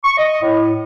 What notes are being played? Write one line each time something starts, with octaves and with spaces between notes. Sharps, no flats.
C#6
D#5
A2